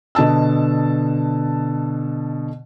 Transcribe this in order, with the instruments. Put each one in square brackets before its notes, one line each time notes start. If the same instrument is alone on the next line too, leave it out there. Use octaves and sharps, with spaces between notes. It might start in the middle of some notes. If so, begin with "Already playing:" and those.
[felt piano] B2 D3 D#5 A5 E6